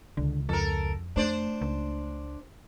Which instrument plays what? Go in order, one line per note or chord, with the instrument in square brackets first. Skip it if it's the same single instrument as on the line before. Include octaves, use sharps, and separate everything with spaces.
[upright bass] C#2 [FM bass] D3
[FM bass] F2 [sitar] A4 A#4
[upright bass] A3 [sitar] D4 C5 D5
[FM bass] C#2